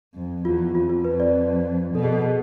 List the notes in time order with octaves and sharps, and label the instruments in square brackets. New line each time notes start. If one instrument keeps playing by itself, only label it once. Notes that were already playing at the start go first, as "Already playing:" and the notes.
[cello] F2
[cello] E2 [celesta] F4
[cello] F2 [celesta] F4
[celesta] F4
[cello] F2 [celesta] B4
[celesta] D5
[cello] B2 [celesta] A4
[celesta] G#4
A4